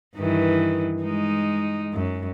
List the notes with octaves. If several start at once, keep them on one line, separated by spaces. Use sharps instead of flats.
G2 D#3 E3
G#3 D#4
F#2